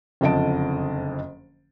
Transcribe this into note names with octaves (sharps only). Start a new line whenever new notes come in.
F#1 F2 D3 D#5 A5 D7